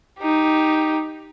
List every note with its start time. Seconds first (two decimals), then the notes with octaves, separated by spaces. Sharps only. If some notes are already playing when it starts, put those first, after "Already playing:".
0.19 D#4 G4